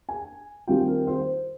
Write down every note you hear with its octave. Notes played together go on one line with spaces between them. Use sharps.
G#5
D#3 G3 C4 F4 G5
A#4
C5